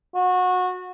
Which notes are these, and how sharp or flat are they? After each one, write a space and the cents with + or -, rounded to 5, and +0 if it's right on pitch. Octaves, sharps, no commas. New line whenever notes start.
F#4 -25